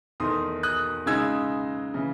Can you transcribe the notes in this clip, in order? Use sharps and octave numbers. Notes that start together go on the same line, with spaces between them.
E2 D#3 A3 D#4 C6 D#6
D#6 F#6
C#3 G#3 D#4 E6 G#6
C#3 E3